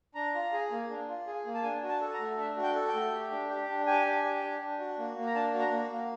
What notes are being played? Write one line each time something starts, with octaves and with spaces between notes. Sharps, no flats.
D4 A#5
F4
G#4
A#3
D4
F4
G#4
A#3
A5
D4 G#5
F#4
A5
A4
A#5
A3
D4 E5
F#4
G5
A4
G5
A3
G4
D4
G4
D4
G4 G#5
D4
G4
D4
D4
F#4
A#3
A#3
A#5
D4 A5
F#4
A#5
A#3
A#3